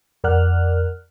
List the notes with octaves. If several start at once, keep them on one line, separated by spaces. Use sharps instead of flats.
F2 A#4 D5 F#5 F6 F#6